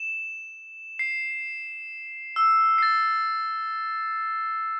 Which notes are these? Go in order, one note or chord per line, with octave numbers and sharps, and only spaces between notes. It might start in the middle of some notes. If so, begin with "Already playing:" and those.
Already playing: E7
C7
E6
C7
A6